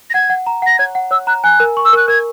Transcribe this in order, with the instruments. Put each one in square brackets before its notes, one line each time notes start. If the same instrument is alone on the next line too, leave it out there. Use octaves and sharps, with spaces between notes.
[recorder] A#6
[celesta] F#5 [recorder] G#6
[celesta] F#5
A#5
[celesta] F#5 [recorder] A#6
[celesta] C#5 [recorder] G#6
[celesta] F#5
[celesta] C#5 [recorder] E6
[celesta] A#5 [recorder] F#6
[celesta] G#5 [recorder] F#6
[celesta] A#4
C#6
[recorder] E6
[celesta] A#4 [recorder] F#6
[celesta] A#4 [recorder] G#6